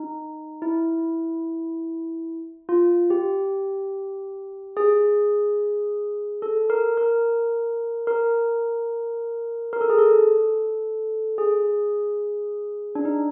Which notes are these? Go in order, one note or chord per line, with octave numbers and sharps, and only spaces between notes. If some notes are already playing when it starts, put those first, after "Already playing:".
Already playing: D#4
E4
F4
G4
G#4
A4
A#4
A#4
A#4
A#4
A4
G#4
A4
G#4
D4
D#4